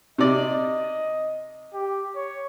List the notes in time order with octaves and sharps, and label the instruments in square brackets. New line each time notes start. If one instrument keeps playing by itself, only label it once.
[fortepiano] C3 D5 [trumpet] D#5
[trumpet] G4
C#5